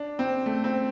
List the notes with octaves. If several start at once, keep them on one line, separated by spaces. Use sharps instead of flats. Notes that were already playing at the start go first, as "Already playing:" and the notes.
Already playing: D4
C4
A3
C4